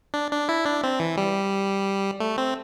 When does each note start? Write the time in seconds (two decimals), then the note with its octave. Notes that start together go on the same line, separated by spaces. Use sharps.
0.14 D4
0.32 D4
0.49 E4
0.65 D4
0.83 C4
1.00 E3
1.18 G3
2.20 A3
2.38 C4